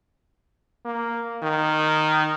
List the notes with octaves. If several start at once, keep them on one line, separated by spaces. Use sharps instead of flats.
A#3
D#3